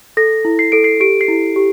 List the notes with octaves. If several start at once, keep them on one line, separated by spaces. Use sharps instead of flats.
A4 A#6
E4
C7
A4 D7
C7
G4 D7
C7
E4
G4